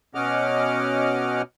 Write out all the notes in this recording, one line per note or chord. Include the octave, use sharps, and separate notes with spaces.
B2 C#4 D#5 F#5 D6 F6